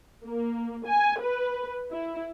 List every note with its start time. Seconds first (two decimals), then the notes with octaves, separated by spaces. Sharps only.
0.23 A#3
0.86 G#5
1.20 B4
1.90 E4